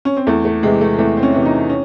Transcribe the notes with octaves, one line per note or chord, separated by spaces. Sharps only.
C#4
C4
E2 A3
A3
C3 E3 G#3
A3
E2 A3
C4
C#4
C3 E3
D#4
C#4